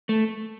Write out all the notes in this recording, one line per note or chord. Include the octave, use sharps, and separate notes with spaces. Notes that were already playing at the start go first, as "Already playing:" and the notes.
A3